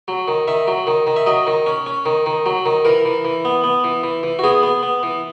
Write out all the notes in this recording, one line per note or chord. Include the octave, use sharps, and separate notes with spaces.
F#3
D#3
D#3 E5
F#3
D#3
D#3
E5
F#3 D#5
D#3
C#4
C#4
D#3
D#3
F#3
D#3
E3 A#4
E3
E3
B3
B3
E3
E3
E3
F#4
B3 G#4
B3
B3
E3